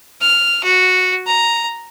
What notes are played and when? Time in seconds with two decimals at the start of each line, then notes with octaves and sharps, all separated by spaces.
0.21 F6
0.64 F#4
1.26 A#5